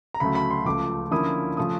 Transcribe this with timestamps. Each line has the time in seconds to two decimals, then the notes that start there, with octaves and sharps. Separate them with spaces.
0.14 A#5
0.20 D2 C#3 F#3 A3 B5
0.35 B5
0.51 C6
0.65 C#2 C#3 F3 A3 D6
1.11 D3 F3 A#3 C#4 E4 D#6
1.57 C#3 F3 A3 C#4 D#6